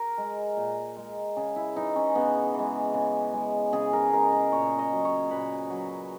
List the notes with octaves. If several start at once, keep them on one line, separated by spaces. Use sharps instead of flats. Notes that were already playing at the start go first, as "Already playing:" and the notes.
Already playing: A#4
G#3
A#2
G#3
C#3 G#4
E4
E3 G#3 D#4
C#4
C#3 B3
E3 G#3
C#3
G#3
C#3 G#4
A#4
G#3 A#4
A#4
A#2 C#5
D#5
F#3
C#5
A#2 B4
F#3